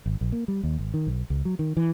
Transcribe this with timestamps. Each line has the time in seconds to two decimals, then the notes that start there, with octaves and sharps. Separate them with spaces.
0.06 G#1
0.21 A#1
0.32 A#3
0.48 G3
0.63 D#2
0.79 G#1
0.94 D#3
1.07 B1
1.30 C#2
1.45 F#3
1.59 D#3
1.77 E3